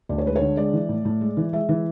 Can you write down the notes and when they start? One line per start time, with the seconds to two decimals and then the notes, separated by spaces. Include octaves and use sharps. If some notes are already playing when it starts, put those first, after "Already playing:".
0.09 D2 D5
0.18 C#5
0.25 G#3 B4
0.36 C#5
0.41 D3
0.57 G#3 D5
0.73 E3
0.89 A2
1.05 A2
1.21 G#3
1.37 E3
1.53 G#3 E5
1.69 E3